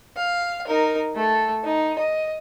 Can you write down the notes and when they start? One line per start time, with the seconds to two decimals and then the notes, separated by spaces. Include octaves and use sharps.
0.16 F5
0.67 D#4 A#4
1.15 A3 A4
1.64 D#4
1.99 D#5